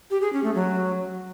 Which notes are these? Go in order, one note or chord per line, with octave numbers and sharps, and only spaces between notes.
G4
G#4
C#4
A3
F#3